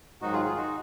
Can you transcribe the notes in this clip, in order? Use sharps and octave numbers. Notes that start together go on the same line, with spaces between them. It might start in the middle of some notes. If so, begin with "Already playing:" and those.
G#2 D#3 F#3 D#4 F#4
F4 G#4
F4 G#4
D#4 F#4